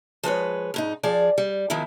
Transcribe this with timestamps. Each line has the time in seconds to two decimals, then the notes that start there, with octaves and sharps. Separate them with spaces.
0.23 F3 G#3 B4 C#5
0.74 F2 G#2 D#4
1.03 F3 G#4 D5
1.38 G3
1.70 D#3 F3 G#3 B3 E4